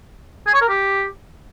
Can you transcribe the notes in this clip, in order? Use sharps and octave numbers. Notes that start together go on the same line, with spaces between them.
G#4
C#5
A#4
G4